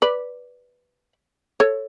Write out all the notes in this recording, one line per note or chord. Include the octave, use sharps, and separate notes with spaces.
B4 D5
A4 C#5